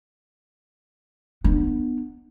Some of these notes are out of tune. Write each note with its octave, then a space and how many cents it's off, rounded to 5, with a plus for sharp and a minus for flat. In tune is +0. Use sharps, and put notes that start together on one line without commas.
B3 +0 D4 +35